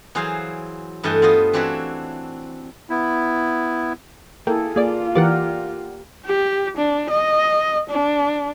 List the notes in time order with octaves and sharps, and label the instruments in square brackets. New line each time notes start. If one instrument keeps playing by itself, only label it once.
[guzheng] E3 F#3 G#4 C5 F5
G2 E3 A3 A4 D#5 G5
B3 F4 C5 D#5
E3 C4 D4 F#4 C#5 E5
[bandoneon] B3 E4
[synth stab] A#3 [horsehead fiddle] E4 G#4 [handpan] A4 [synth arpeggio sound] G5
[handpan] A#3 [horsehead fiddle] F4 [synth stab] G#4 D5
[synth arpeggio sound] E3 A#3 [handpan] G4 A#4 [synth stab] D5 F#5
[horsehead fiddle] G4
D4
D#5
D4